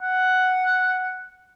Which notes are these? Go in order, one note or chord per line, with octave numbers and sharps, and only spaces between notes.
F#5